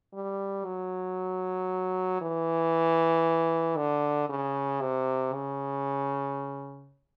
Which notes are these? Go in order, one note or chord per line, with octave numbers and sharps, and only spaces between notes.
G3
F#3
E3
D3
C#3
C3
C#3